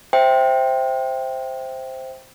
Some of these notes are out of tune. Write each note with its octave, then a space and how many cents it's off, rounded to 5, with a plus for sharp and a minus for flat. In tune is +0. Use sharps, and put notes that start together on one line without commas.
C5 +0 E5 +0 G5 +0